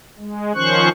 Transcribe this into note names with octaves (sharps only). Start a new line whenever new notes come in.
G#3
D#3 F3 C#4 C5 C#6 F#6